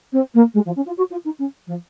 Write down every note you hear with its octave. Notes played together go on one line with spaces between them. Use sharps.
C4
A#3
G#3
F3
C#4
F4
F#4
F4
D#4
C#4
F3